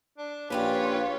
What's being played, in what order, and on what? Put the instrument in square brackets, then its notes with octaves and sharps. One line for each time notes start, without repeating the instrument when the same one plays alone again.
[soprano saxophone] D4
[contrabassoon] A#1 [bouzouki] C#4 D#4 G4 [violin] F4 C#5 [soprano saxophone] B4